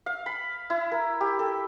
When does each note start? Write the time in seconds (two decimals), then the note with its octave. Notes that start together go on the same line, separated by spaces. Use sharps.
0.06 F5
0.26 B5
0.70 E4
0.92 A#4
1.21 G4
1.39 A4